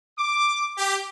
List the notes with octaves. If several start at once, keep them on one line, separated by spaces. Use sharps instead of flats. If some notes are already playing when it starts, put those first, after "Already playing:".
D6
G4